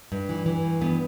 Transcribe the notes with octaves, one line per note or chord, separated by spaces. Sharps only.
G2
E3
E3
G2
G2 B3